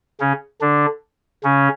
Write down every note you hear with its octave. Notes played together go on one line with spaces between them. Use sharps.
C#3 C#4
D3 D4
C#3 C#4